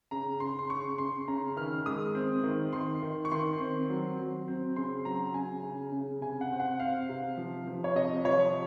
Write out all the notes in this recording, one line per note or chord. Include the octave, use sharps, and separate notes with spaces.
C#3 A#5
C#3 C6
C6
C#3 C#6
C#3 C6
C#3 A#5
D#3 F6
G#3 D#6
C4
D#3
D#3 C6
D#3
C#6
D#3 C6
C4
F#3
F#3
C4
C#3 C6
F#3 A#5
C#3 G#5
C#3
C#3
C3 G#5
F#5
C4
F#5
C4 F5
C3
F3
F3
C#5
C3 D#5
F3 C#5